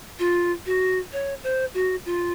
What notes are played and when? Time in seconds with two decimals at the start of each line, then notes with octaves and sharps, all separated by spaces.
0.19 F4
0.66 F#4
1.12 C#5
1.43 C5
1.74 F#4
2.06 F4